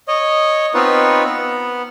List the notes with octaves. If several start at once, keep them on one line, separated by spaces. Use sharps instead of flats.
C#5 D#5
B3 C4 D#4 F4 B4 C#5
B3